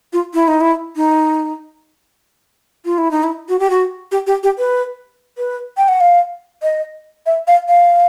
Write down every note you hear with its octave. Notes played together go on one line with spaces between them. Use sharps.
F4
E4
D#4
E4
D#4
F4
E4
D#4
E4
F#4
G4
F#4
G4
G4
G4
B4
B4
G5
F#5
F5
D#5
E5
F5
F5